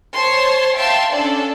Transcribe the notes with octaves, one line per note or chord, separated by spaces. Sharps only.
C5 C#5 A5 C6
E5 F5 G5 A5 C6
C#4 D4 A4 D5